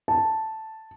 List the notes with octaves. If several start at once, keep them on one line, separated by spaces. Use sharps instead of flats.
A5